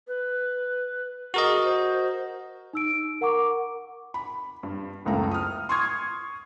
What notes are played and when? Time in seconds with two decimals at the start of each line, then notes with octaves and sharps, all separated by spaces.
0.08 B4
1.34 F#4 G#4 A#4 D#5
1.65 C5
2.73 D#4 E6 D7
3.21 A#4 F#5 A#5 C#6 D6
4.14 B5
4.63 G2
5.05 F#1 C#2 A3 A#5
5.31 D#6 F6
5.69 C6 C#6 D#6 F6 G#6